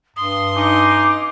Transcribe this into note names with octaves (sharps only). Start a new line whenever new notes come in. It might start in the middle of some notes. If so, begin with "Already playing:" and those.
G2 C6 D#6
C#4 D#4 D6